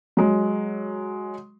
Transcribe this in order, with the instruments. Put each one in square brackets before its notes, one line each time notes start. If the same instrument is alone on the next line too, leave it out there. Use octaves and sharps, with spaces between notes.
[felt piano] F#3 G#3